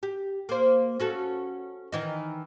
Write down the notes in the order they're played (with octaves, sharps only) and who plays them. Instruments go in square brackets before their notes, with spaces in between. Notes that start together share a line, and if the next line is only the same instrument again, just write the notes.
[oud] G4
A#3 C5
C#4 F#4 A4
D#3 E3 D#4